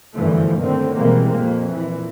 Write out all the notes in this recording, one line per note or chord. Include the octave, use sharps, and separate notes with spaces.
G1 F#2 D3 E3 F3 A3
D#2 A2 D3 D#3 C4
B2 E3 G3 G#3 A#3 C4
F2 A#2 A#3
A#2 E3